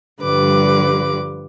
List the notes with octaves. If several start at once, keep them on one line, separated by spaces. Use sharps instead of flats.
G2 D3 F3 G3 B4 D6